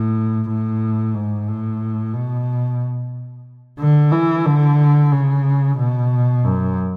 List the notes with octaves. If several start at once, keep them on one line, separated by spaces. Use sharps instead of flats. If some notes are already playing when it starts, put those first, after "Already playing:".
Already playing: A2
A2
G#2
A2
B2
D3
E3
D3
C#3
B2
F#2